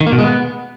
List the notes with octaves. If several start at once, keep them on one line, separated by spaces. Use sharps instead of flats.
D#3
A#3
B2
G#3
B3